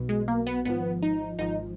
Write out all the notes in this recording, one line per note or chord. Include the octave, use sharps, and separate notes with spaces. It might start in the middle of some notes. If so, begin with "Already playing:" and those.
Already playing: B1 B2
G#3
A#3
B3
G#1 G#2 F3 B3
D#4
G#1 G#2 F3 D#4